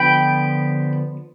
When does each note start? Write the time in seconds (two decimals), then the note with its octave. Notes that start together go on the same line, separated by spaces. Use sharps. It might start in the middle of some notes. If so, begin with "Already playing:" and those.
Already playing: D3 F3 B3 G5 B5